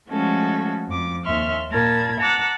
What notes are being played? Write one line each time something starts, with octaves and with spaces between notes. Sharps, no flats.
F3 G#3 A3 C#4 F#4 A4
F2 D6
D#2 E5 C6 C#6 F6
A#2 A#4 A5 B5 G#6
F#5 A5 A#5 D6 E6 F#6